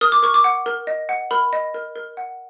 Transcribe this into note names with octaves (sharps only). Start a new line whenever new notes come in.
A#4 D#6
D6
A#4 C#6
D6
F#5
A#4
D#5
F#5
A#4 B5
D#5
A#4
A#4
F#5